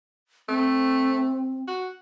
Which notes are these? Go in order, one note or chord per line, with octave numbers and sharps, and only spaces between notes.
A3 C4
F#4